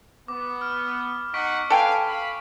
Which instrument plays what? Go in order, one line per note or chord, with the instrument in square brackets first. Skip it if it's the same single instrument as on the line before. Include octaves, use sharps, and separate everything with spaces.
[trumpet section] B3 [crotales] D6
[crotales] F6
[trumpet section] D#4 F#5 [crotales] C#6 B6 D7
[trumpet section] D4 B4 F5 [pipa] A4 G5 G#5
[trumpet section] F5 B5